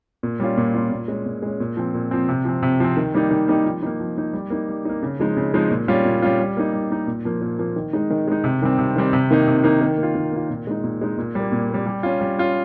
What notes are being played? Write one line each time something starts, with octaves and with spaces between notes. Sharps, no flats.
A#2
G3 C#4 F4
A#2
G3 C#4 F4
A#2
G#3 C#4
A#2
G#3 C#4
A#2
F3 C4
A#2
F3 C4
C3
F3 C4
C3
F3 C4
D#3
G3 A#3 D#4
D#3
G3 A#3 D#4
F3
A#3 D#4
F3
A#3 D#4
G3
A#3 D#4
G3
A#3 D#4
C#3
F3 G#3 D#4
C#3
F3 G#3 D#4
A#2
G3 C#4 F4
A#2
G3 C#4 F4
G3
A#3 D#4
G3
A#3 D#4
A#2
F3 A#3
A#2
F3 A#3
D#3
G#3 D#4
D#3
G#3 D#4
C3
D#3 G3 C4
C3
D#3 G3 C4
C3
D#3 A#3 D#4
C3
D#3 A#3 D#4
D#3
A#3
F4
D#3
A#3 F4
A#2
G#3 D#4
A#2
G#3 D#4
A#2
G3 A#3
A#2
G3 A#3
G3
C#4 F4
G3
C#4 F4